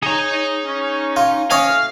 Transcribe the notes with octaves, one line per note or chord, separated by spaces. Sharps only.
D#4 G#4 C#5 A#5
C#4
F4
C#4 D#5 F5 G#5
A2 F#4 F6